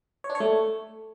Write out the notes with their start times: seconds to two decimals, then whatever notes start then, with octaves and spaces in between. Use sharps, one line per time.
0.24 C#5
0.30 D4
0.35 C#5
0.40 A3